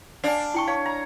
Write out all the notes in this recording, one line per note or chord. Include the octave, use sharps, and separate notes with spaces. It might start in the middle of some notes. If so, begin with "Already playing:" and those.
D4 D5 F5 G#5
E4 G5 C#6
C#5 F5
A#5